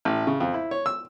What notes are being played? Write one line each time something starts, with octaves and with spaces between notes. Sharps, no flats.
A1
C#3
F2
E4
C#5
E6